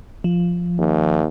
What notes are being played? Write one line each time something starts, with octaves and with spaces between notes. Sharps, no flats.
F3
D#2